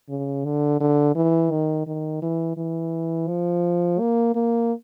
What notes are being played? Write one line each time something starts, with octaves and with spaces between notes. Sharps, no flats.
C#3
D3
D3
E3
D#3
D#3
E3
E3
F3
A#3
A#3